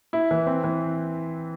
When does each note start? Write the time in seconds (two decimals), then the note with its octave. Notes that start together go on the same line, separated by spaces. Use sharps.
0.13 E4
0.31 E3
0.47 C4
0.64 E3